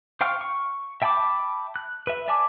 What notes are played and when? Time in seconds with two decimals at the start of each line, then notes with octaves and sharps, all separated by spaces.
0.21 C5 F5 G5 C#6 F6
0.41 C#6
1.02 E5 G5 A5 B5 D6
1.76 F#6
2.07 B4 E5
2.28 D5 E5 G#5 A5 D6